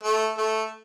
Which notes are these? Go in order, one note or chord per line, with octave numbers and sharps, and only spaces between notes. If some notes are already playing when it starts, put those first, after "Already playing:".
A3
A3